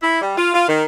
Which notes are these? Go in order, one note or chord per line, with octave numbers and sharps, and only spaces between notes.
E4
G3
F4
F4
D#3